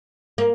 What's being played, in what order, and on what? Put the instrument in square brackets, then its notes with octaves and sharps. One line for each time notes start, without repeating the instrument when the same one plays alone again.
[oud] A#3